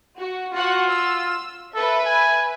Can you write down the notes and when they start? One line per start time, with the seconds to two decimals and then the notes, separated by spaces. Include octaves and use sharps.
0.18 F#4
0.53 F4 F#4 F#5
0.89 E6
1.74 A4 B4 E5
2.06 G#5